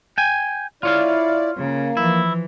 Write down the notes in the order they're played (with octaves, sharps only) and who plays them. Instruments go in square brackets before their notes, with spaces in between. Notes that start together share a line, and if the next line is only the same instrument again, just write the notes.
[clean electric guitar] G5 G#5
[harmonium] E4 D5 [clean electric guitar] F4 C#5 F5
[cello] C#3 [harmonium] A#3
[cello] E3 F3 [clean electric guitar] E4